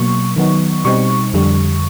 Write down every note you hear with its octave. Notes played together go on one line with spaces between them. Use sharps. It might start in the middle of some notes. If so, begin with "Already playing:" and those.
Already playing: B2 F#3 A#3 C#6
D#3 F#3 B3 D#4
B2 G3 C4 D#4 C#6
F2 D3 G3